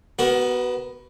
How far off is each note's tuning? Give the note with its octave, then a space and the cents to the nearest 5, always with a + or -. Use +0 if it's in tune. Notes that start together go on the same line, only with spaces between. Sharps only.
B3 +0 F#4 +30 A#4 +25